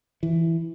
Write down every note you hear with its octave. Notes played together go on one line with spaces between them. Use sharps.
E3